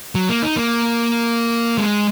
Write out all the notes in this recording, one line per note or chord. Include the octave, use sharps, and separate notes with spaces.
F#3
A#3
D#4
A#3
G#3